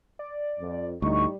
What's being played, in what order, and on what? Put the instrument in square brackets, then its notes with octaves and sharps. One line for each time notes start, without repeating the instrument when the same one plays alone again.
[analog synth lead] D5
[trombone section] F2
[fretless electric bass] D2 [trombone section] A2 D#4 [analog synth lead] G3 [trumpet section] C#6